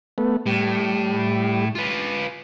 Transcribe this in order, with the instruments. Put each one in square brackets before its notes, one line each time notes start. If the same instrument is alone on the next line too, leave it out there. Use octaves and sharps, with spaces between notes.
[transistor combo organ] A3 B3
[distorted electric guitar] A2 [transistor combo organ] G3
[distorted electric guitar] F4 B4